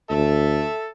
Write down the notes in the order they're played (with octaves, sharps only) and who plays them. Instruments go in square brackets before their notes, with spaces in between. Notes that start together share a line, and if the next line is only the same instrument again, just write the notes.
[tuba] D2 [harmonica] A4 E5